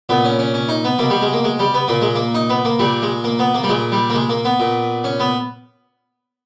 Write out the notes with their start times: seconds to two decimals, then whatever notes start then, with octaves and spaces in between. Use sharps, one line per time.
0.09 A#2 B3
0.24 C#4
0.39 C#4
0.54 C#4
0.69 D#4
0.84 B3
0.99 B2 A#3
1.10 G3
1.22 G#3
1.33 A#3
1.44 G#3
1.59 G3
1.74 B3
1.88 A#2 A#3
2.01 G#3
2.15 A#3
2.34 D#4
2.49 B3
2.65 A#3
2.79 A#2 G3
3.02 G#3
3.24 A#3
3.39 B3
3.54 A#3
3.63 G3
3.69 A#2 G#3
3.92 G3
4.10 A#3
4.15 G#3
4.29 A#3
4.45 B3
4.60 A#2
5.04 C#4
5.20 B3